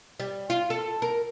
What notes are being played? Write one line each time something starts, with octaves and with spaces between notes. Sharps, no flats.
G3
F4
A4
A#4